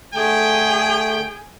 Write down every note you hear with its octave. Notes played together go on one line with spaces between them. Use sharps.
D3 A3 G#4 G5